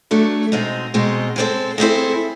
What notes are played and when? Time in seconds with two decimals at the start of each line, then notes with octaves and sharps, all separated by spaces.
0.11 F#3 A3 D4
0.52 B2 G#3 C4 D#4
0.94 B2 G#3 C4 D#4
1.36 G#3 C4 E4 A4 C5
1.78 G#3 C4 E4 A4 C5